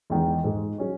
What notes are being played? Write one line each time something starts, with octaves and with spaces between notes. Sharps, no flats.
E2 D#3 G#3 D#4
G#2 D#3 G#3
F#3 C#4 G#4 C#5